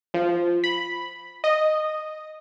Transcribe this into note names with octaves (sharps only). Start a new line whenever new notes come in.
F3
B5
D#5